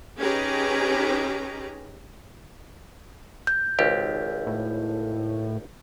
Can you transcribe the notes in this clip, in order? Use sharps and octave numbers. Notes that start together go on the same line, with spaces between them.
C#4 D#4 G4 G#4 B4 A#5
G6
G#1 C#2 G4
A2